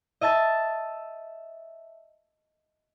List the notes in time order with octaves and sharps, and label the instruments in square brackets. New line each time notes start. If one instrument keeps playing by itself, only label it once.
[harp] D#5 E5 A5 A6